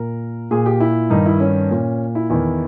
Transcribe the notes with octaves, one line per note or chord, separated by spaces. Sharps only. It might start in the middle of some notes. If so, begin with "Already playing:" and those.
Already playing: A#2 A#4
A#2 G#4
G4
E4
G2 D#3 D#4
E4
C#4
A#2
E4
E2 D#3 E4